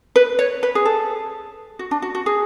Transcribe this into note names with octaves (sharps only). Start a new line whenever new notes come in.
B4
C#5
B4
G#4
A4
F#4
D4
F#4
F#4
G#4